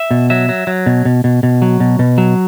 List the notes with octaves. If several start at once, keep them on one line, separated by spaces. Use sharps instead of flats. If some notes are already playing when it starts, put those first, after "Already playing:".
Already playing: E5
B2
F#3 E5
F#3
F#3
B2
B2
B2
B2
F#3
B2
B2
F#3